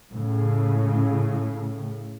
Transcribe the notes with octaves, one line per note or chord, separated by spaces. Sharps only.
A2 C#3